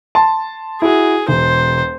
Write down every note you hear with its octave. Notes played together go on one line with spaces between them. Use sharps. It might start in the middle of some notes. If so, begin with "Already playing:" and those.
A5 C6
E4 F#4 G#4
E1 C5